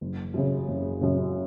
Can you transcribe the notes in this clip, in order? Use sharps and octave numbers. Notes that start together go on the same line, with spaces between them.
F#1
F#2 C#3
F#1
F#2 C#3